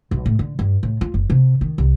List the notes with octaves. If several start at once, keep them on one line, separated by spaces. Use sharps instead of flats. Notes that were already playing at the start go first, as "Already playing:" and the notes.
B1
A2
D3
G2
A2
F4
F#1
C3
D#3
C2